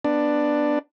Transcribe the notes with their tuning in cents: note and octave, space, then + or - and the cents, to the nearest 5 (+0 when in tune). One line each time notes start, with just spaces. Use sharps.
B3 +0 D4 +10